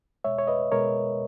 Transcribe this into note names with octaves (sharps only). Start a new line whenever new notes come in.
B2 G#3 C#5 E5
C#5
B4 D#5
B2 G#3 A#4 C#5